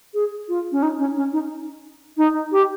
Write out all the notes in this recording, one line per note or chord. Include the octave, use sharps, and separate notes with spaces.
G#4
F4
C#4
D#4
C#4
C#4
D#4
D#4
G4